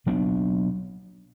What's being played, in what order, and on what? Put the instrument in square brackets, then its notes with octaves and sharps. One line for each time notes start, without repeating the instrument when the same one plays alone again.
[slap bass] B2 F#3 B3 D4